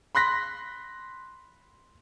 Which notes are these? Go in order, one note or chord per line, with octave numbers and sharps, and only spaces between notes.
B5 C6 F#6 A#6 B6